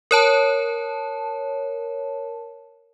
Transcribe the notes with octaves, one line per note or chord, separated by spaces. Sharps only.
A#4 C#5 A5